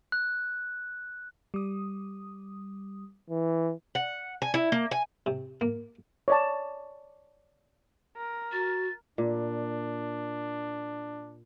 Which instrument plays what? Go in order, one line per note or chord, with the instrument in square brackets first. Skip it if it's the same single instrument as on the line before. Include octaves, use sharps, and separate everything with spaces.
[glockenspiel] F#6
[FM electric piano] G3 D#6
[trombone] E3
[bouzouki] F#5
G#5
E4
A#3
G#5
[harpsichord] C3
A#3
[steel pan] C#5 D5 A5
[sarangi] A#4
[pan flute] F#4 [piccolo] A6
[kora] A#2 [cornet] D4